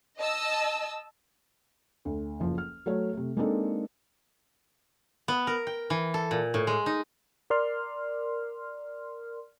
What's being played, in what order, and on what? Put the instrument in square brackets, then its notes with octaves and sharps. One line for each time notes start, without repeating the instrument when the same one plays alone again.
[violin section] D#5 A5 E6
[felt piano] D2
F#1 F3
F6
F#3 A3 C#5
C3 A3
G#3 A#3 C4 D4 D#4 A4
[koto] B3
A#4
G5
E3
A4
A#2
A2
G#3
D#4
[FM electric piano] A#4 D5 C6 F6